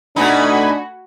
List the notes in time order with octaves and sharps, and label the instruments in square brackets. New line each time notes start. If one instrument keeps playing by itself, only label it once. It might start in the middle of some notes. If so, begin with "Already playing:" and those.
[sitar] B2 D#4 [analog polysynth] A3 G#5 B5 [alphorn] D4 [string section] F#4